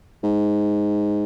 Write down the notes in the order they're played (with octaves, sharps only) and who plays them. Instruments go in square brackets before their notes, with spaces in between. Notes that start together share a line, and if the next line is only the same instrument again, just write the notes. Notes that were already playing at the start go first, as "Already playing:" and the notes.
[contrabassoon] G#2